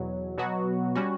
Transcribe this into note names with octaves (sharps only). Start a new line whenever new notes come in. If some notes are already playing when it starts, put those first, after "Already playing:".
Already playing: E2 B2 F#3
B2 F#3 B3 F#4
G3 C#4 F#4